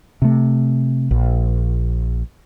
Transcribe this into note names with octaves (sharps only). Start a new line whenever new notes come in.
C3 A3
A#1